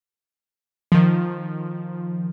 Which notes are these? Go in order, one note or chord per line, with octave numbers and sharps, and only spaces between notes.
D#3 F3